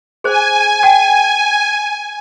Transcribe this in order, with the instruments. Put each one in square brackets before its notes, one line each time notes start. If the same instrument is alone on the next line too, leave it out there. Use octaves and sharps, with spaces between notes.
[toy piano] G#4 C5 [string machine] G#5
[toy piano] F#5 G5